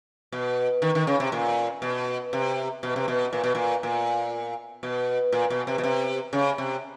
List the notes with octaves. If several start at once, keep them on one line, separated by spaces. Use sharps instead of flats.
B2
D#3
D#3
C#3
C3
A#2
B2
C3
B2
C3
B2
A#2
B2
A#2
A#2
B2
A#2
B2
C3
B2
C3
C#3
C3